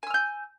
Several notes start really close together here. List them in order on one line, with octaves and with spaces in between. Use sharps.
G#5 E6 F6 G6